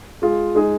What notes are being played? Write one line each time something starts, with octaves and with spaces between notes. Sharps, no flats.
G#3 F4 G#4
G#3 D#4 G#4